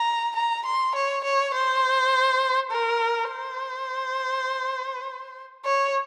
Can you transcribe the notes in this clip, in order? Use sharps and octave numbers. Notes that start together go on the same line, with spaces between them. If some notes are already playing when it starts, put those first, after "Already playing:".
Already playing: A#5
A#5
C6
C#5
C#5
C5
A#4
C5
C#5